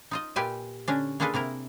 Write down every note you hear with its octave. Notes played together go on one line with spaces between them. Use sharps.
D#4 F4 D#5
A#2 F4 G4 B4 E5 G#5
D3 C#4 D4
A#3 D4 F4 G#4 A4 B4
C3 A#3 E4 A#4